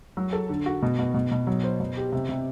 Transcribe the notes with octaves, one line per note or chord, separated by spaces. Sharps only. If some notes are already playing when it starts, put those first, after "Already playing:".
F#3
A4
D3
F#4
B2
B2
B2
B2
F#3
C5
B2
G4
C3
C3